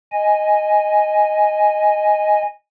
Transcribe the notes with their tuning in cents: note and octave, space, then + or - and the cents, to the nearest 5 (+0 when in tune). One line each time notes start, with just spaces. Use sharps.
D#5 +5 G#5 +0